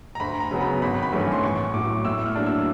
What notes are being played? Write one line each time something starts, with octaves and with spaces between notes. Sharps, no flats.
A#5
D2 B5
A#5
C#3 F#3 B3
B5
G#1 B5
B5
G2 E3 A3 C#4
C6
A1 C#6
A2 F#3 D6
A2 E6
F6
F#3 A#3 D4
E6